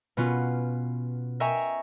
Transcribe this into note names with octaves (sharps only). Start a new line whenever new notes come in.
B2 B3 C#4 F4
D#5 E5 G5 G#5 A#5 C#6